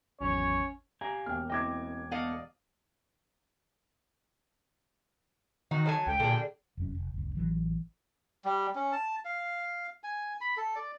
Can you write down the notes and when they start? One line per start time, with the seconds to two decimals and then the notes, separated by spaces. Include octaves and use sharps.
0.21 G#1 E2 F#3 C#4 C#5
1.01 G4 F5 G#5 A#5
1.26 E1 A#3 G5 F6
1.50 C4 E4 D#5 G5 D6 G#6
2.11 B3 A4 D5 D#5 F5 F#5
5.71 D#3 D#4 F#4
5.86 F#3 A4 G#5
6.06 C#2 G5
6.20 A#2 D3 G3 G#4
6.77 F1 F#2 C#4
6.95 F1
7.14 F#1 C#2
7.35 A1 E3 F#3
8.45 G3
8.75 C#4
8.92 A5
9.25 F5
10.04 G#5
10.41 B5
10.57 A4
10.76 D5